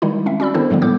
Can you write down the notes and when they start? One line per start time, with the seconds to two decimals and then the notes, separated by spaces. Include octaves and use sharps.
0.02 D#3 G3 G#3 D#4 E4
0.26 C4 C#4 E5
0.40 C#4 F#4 D5 B5 E6
0.54 D#3 B3 D4 E4 A4 C5
0.70 G#2 D3 F3 G3 G#3 B3
0.82 A2 B3 A4 D6 G6